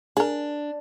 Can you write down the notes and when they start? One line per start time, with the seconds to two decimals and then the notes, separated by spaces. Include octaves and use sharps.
0.17 D4 G#4 A#4